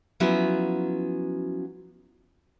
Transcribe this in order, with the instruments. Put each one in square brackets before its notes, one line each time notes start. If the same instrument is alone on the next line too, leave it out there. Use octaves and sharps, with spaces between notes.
[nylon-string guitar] F3 F#3 B3 C#4 E4 F#4